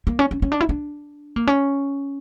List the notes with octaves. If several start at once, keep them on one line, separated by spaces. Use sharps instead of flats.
A#3
C#4
C#4
C#4
D4
E4
D4
A#3
C#4